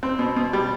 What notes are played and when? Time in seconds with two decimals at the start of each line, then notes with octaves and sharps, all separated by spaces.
0.03 C4
0.19 B2
0.36 B2
0.53 G3